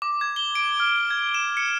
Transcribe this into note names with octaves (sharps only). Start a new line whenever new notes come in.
D6
G#6
G7
D7
F6
G#6
E7
C#7